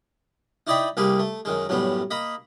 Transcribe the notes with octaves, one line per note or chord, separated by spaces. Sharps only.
D#4 E4 D5 D#5 G5 B5
C2 A#3 G4 G#4 B4
A3
F#2 D#3 G#3
F#2 A2 G3 B3
A#3 D#5 B5